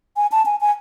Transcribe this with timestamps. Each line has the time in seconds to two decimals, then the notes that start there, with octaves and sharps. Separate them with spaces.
0.17 G#5
0.32 A5
0.46 G#5
0.61 G#5